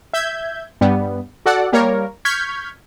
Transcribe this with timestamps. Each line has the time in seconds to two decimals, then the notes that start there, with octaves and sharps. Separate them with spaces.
0.14 E5 G6 G#6
0.81 G2 G3 B3
1.46 F#4 A4 D5 F#5
1.72 G3 A#3 A#4 C#5
2.25 C#6 F6 G6 G#6 B6